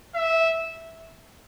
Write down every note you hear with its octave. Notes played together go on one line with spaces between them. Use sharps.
E5